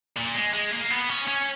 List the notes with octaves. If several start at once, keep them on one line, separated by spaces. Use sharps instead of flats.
A#2
G#3
G#3
A#3
B3
C#4
C#4